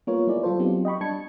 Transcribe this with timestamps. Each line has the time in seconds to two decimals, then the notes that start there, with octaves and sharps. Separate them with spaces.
0.07 G3 A#3 B3 F4 A#4 C#5
0.27 G3 B3 E4 G#4 D5
0.43 F#3 G3 F4 A4 C5
0.59 F#3 B3 C4 D#4 F4 G4
0.85 D#5 G5 B5 C#6
1.01 G3 D4 A5 G#6 C#7